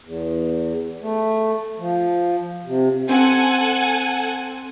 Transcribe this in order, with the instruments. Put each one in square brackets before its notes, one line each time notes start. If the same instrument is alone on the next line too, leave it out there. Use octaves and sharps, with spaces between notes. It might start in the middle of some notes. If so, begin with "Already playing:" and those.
[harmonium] E2
A3
F3
C3
[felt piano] C4 [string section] A4 F#5 G#5